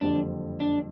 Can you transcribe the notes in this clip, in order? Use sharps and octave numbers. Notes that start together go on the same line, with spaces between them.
F#1 F2 D3 G3 D4
D4